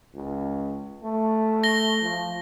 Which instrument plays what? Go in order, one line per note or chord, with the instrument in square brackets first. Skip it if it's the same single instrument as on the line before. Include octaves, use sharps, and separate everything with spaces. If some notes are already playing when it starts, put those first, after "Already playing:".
[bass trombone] C#2
A3
[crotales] A#6 G7
[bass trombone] F3